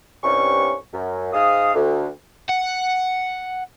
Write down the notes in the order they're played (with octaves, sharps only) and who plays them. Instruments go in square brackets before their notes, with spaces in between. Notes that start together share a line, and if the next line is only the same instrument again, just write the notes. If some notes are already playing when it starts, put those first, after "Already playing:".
[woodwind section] C2 G2 C#4 C#6
F#2
G#2 F5 D#6
D2
[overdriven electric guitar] F#5